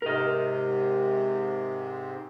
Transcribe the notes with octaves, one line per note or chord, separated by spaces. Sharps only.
G#2 C3 A#4 D#5